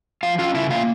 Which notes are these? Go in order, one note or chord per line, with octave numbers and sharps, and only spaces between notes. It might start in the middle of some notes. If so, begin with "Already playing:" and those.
F3 F4 F5
C#4 F4 F5
C#3 E4 E5
A#3 F4 F5